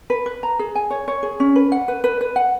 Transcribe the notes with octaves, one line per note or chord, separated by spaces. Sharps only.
B4
B4
A#5
G#4
G#5
C#5
C#5
G#4
C#4
B4
F#5
B4
B4
B4
F#5